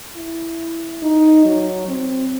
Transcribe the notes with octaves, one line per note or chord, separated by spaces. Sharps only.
E4
D#4
F#3
C4